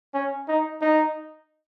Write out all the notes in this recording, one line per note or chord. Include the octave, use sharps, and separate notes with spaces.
C#4
D#4
D#4